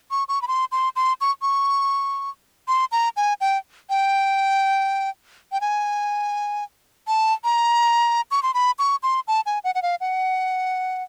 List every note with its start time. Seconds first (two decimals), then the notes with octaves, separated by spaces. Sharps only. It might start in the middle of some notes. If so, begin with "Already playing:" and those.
0.11 C#6
0.29 C#6
0.42 B5
0.48 C6
0.72 C6
0.96 C6
1.21 C#6
1.42 C#6
2.68 C6
2.92 A#5
3.16 G#5
3.41 G5
3.90 G5
5.52 G5
5.61 G#5
7.08 A5
7.44 A#5
8.31 C#6
8.43 C6
8.54 B5
8.79 C#6
9.03 C6
9.28 A5
9.46 G#5
9.64 F#5
9.75 F#5
9.82 F5
10.01 F#5